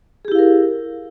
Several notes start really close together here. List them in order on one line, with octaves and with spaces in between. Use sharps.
G#4 G4 E4 F5 A#4